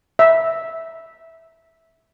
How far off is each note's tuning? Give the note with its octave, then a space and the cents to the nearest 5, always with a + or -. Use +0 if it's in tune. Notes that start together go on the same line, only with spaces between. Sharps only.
E5 -10